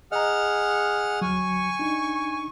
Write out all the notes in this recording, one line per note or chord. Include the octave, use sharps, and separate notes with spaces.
G#4 D#5 F#5 A#5 F6
D2 F#3 G#5 C#6
D4 D#4